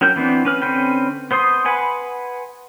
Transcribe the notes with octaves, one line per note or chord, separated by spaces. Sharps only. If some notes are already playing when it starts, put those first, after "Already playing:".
F#3 C#4 A#4 G5 G6
E3 B3 C4 D4
C#4 B4 F6
D3 C4 C#4 B4 G5
B3 C5 C6 D#6
B4 F#5 G#5 B5 C6